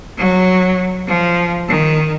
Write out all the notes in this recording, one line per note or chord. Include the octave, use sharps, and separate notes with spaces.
F#3
F3
D#3